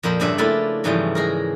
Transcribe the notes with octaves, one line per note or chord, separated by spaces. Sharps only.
F2 A#2 A#3 C5 B5
G2 C#3 C4 D4 E5 G#5
A3 A#3 E4 F4 A4 B4
G#2 C#3 E3 F3 G3 A3
G#3 G#4 A#4